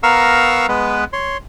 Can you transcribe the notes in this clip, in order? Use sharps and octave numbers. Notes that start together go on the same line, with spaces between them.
B3 A#4 F5 A#5 C#6 E6
G#3 B3 B4
C#5 C6